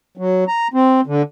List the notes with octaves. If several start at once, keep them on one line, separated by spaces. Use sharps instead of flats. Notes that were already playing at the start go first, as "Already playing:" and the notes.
F#3
A#5
C4
D3